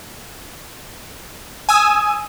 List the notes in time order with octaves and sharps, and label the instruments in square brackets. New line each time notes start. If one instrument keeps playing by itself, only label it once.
[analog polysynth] G#5 D#6 E6